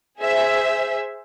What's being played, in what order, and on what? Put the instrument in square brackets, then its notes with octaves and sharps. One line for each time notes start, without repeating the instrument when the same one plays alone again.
[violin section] G#4 C5 E5